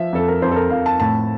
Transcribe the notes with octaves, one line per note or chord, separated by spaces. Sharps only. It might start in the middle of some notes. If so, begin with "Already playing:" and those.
Already playing: F3 E5
F2 A4
A#4
F2 C5
A4
A#4
F2 F5
A5
A2 A5